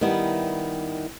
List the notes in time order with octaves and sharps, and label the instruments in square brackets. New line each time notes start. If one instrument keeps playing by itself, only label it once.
[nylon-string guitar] D#3 G3 B3 E4